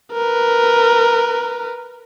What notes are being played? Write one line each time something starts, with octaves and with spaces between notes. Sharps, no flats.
A#4 B4